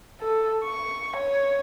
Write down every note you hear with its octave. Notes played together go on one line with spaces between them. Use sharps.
A4
C#6
C#5